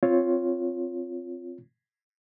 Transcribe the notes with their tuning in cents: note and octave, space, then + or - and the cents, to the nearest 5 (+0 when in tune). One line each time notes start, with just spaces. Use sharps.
C4 +0 F4 +0 C#5 +0